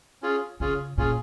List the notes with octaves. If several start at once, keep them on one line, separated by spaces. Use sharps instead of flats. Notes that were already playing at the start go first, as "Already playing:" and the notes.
C#4 F4 G#4
C#3 C#4 F4 G#4
A#2 C#4 F4 G#4